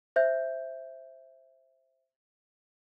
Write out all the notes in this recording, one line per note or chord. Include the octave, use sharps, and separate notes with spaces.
C5 E5 G6